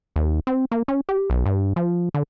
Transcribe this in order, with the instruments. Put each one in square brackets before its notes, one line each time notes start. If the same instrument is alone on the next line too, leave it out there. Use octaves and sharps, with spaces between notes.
[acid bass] D#2
C4
A#3
C#4
G4
B1
G2
F3
D3